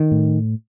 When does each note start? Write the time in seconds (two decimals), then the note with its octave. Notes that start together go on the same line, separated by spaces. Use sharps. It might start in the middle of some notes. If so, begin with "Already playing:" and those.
Already playing: D#3
0.11 A2